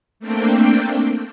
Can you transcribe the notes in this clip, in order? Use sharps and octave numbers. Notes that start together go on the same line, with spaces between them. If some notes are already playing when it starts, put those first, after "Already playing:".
A3 A#3 C4 D4 G5